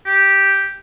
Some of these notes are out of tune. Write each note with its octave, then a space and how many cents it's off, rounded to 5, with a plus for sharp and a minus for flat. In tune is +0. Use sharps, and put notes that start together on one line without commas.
G4 -5